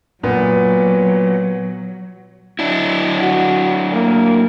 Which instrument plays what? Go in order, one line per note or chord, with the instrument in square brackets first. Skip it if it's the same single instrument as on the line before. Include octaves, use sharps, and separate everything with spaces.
[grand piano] A#2 B3 [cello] F#3
[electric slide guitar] F#3 D4 E4
[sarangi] F#4
A#3